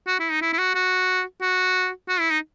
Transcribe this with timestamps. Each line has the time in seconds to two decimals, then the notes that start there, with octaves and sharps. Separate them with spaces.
0.07 F#4
0.20 E4
0.31 D#4
0.42 E4
0.53 E4
0.59 F#4
0.75 F#4
1.42 F#4
2.09 F#4
2.20 E4
2.31 D#4